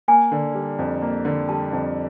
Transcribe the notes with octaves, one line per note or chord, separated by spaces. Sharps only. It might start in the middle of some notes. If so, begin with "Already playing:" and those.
A#3 G#5
D3
G3
F2
A#3
D3
G3 A5
F2